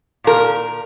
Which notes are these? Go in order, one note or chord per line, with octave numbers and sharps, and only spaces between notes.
A#2 A#4